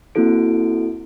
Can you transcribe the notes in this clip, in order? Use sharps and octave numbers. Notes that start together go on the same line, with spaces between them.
A#3 C4 E4 F#4 A4 D7